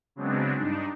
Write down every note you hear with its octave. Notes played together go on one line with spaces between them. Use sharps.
C#3 F#3 G#3 B3 C4 D4
G2 D4 D#4